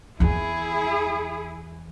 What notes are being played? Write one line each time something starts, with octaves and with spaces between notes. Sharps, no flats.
E2 E3 E4 G#4